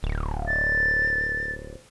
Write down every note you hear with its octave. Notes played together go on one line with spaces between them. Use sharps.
D1
A6